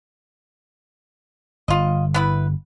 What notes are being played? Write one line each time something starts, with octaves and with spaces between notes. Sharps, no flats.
G1 F4 D#5
B3 E4 B4